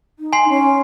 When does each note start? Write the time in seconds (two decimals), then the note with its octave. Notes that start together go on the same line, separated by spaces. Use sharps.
0.19 D#4
0.33 G#5 C6 C7
0.49 C#4